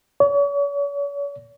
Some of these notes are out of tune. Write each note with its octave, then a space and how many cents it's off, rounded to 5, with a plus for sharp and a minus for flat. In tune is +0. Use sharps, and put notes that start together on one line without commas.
C#5 +40